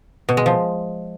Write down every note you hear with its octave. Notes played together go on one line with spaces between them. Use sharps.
B2
G#3
F3